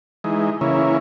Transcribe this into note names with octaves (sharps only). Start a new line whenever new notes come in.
E3 G#3 D#4
C#3 E3 A#3 C#4 E4